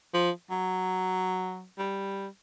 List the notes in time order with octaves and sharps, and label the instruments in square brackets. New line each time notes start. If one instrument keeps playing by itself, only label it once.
[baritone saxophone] F3
F#3
G3